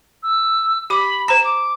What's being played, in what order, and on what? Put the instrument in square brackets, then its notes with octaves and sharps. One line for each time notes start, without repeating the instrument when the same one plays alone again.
[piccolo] E6
[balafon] G4 D6 [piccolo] B5
[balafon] C5 A#5 [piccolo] E7
[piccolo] D6